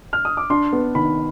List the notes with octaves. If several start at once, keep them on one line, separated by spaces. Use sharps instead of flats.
F6
D#6
D6
D4 C6
B3
D#3 B5